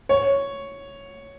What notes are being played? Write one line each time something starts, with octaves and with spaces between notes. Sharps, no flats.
C#5